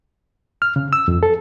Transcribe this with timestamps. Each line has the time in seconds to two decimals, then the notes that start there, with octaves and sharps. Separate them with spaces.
0.62 F6
0.76 C#3
0.93 E6
1.08 F2
1.23 A4